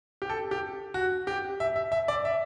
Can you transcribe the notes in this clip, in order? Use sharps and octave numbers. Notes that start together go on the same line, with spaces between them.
G4
A4
G4
F#4
G4
E5
E5
E5
D5
E5